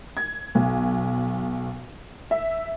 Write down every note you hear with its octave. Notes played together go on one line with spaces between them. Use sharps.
G#6
B1
E5